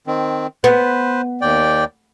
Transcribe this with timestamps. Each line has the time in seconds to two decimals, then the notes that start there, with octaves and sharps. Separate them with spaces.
0.07 D#3 C4
0.64 B3 B4 C5
1.41 D#2 D5 G5